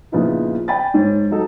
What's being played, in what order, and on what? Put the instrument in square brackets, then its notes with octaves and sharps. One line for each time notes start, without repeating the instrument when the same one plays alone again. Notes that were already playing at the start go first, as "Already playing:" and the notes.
[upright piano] A#2 C#3 F3 B3 D#4 E4
D5 G5 G#5 B5 A6
G#2 C#5
F#3 D#4 A4